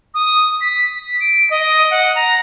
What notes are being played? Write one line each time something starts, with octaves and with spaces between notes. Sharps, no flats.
D#6
B6
D7
D#5
F#5
A#5